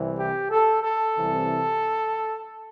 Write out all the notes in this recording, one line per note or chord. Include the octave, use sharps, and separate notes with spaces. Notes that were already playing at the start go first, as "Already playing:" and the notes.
Already playing: C2 C3 E3
G4
A4
A4
C2 C3 E3